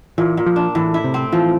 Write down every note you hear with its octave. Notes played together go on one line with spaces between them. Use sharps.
A#2 E3
A#2
F3
D4
A2 E3
E4
C3
C4
E3 F3